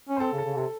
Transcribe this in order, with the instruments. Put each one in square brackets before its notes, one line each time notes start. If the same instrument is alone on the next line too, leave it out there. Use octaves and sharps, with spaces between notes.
[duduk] C#4
[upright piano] C5
[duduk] C4 [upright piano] A4
[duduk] C#3
[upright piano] A4
[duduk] C#3
[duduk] C3 [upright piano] A4